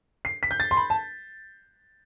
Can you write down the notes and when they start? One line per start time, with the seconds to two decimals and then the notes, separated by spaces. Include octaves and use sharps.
0.25 C7
0.43 B6
0.51 G6
0.60 A6
0.71 C6
0.77 B5
0.90 A5